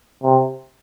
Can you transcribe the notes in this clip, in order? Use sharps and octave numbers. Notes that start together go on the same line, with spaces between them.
C3